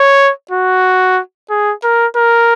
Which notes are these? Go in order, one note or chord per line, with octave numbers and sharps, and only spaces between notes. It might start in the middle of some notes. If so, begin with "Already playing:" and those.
Already playing: C#5
F#4
G#4
A#4
A#4